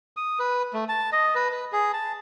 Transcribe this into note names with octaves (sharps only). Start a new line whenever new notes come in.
D#6
B4
A3
A5
D#5
B4
B4
G#4
A5